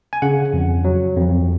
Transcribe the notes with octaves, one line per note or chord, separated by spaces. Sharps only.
G#5
C#3 F#5
F2
F#3
F2